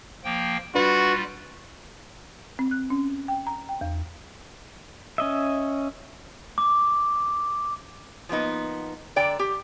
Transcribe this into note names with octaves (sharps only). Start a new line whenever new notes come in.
F3 A#3 G5
G3 D4 F4 F#4 B4
C4
F#6
C#4
G5
A#5
G5
E2
C#4 D#5 E5
D6
F3 A#3 B3 D#4
D3 D5 G5 A#5
G4